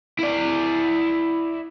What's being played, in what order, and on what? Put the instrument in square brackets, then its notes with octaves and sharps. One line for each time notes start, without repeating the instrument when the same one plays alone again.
[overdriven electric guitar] E4 D5